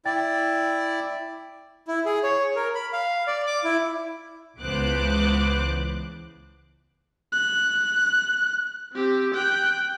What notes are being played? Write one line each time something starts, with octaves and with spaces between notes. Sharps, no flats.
E4 D5 G5 A6
E4
G#4
C#5
A#4
B5
F5
D5
D6
E4
C#2 E3 B3 C5 D6 F#6
F#6
C4 G4
G5 F#6